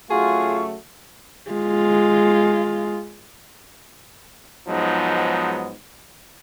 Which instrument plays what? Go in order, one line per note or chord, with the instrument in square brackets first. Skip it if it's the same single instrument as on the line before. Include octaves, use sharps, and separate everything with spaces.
[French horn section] C#3 F#3 A3 [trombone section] F4 F#4 [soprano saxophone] G#4 [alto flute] C#6
[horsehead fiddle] G#3 F4
[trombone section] G#2 F3 F#3 G#3 B3 D#4